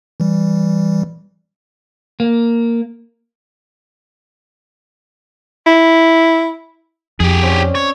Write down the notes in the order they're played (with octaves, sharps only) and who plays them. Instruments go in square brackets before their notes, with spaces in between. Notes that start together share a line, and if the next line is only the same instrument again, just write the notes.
[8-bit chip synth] E3 G3
[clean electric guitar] A#3
[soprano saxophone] E4
[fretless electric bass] F2 [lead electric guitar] G4 G#4
[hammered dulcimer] C4 C#4 D5
[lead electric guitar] C#5